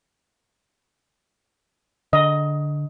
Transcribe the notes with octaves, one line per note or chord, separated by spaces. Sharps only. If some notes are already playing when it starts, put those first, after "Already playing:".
D3 D#5